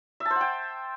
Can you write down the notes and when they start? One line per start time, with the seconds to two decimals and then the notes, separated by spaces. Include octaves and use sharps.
0.20 E5
0.25 A5
0.30 C5
0.36 F#5
0.41 G5